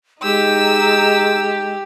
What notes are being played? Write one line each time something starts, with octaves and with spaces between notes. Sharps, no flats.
G#3 D#4 G4 E6